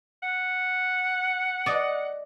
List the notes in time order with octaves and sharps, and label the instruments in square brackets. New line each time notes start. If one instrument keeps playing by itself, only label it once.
[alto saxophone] F#5
[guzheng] D5 D#5